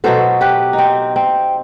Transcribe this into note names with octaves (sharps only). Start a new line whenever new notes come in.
B2 F#3 B3 A4 C5
G4 B4
D#4
C4
C4